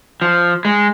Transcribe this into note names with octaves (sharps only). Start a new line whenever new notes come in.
F3
G#3